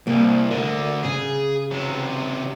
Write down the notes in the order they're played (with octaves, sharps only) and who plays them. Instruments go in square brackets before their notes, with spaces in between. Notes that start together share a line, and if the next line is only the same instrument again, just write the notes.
[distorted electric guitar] C2 [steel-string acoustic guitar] A#3
[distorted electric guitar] D2 D3 [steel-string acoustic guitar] A#4
[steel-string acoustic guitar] C#3 [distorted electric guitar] G#4
[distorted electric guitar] C3 F#3